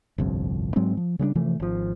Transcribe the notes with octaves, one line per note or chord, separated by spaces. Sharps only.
G1 C2 F2
G#2 F#3 G#3 C4
F3
C#3 G3 B3 D4
C3 E3 F3 A3
G#1 F3